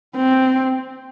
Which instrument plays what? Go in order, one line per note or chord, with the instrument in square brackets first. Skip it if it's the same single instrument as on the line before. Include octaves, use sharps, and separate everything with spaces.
[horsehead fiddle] C4